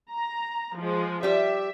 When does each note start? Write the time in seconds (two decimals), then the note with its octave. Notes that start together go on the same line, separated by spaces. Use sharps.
0.11 A#5
0.77 F3 G#3
1.23 G3 G4 E5